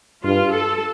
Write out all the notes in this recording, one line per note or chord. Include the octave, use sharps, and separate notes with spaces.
G2 F4
A4